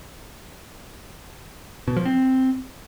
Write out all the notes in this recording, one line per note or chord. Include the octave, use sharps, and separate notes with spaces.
B2
F3
C4